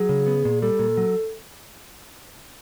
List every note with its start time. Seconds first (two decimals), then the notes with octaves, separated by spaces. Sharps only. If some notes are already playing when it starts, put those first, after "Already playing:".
Already playing: F#3 G#4
0.09 C#3
0.27 B3
0.45 A#2
0.62 G3 A4
0.79 A#2
0.97 F#3